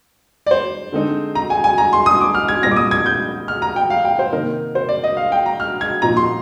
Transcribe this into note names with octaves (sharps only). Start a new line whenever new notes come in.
D5
C5
D3 G#3 C4 D#4
A#5
G#5
G#5
A#5
C6
D#6
D6
F6
G#6
A#2 G3 C4 A#6
D6
D#6
G#6
G6
F6
A#5
G5
F5
G5
C5
C3 D#3 A#3 D#4 A#4
C5
D5
D#5
F5
G5
A#5
F6
G#6
A#2 F3 C4 D#4 A#5
C6